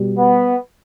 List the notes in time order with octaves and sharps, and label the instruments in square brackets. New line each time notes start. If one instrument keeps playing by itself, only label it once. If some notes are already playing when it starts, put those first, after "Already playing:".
Already playing: [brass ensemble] B2 G3
B3